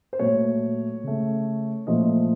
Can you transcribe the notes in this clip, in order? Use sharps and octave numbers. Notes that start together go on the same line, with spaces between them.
C5
A#2 F#3 A3 C#5
C#3 A3
A#2 F3 A3 D#5